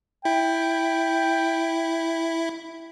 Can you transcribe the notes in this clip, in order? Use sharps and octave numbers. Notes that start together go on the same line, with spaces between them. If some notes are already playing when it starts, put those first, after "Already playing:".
E4 G5